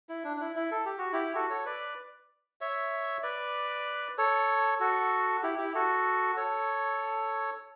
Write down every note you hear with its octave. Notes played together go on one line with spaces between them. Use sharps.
E4
D4
D4
E4
E4
A4
G4
F#4
E4 G4
F#4 A4
A4 C#5
B4 D5
C#5 E5
B4 D5
A4 C#5
F#4 A4
E4 G4
E4 G4
F#4 A4
A4 C#5